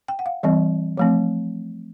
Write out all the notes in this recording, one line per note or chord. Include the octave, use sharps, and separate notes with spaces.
G5
F#5
F5
E3 G3 C4 D#5
F3 A3 C4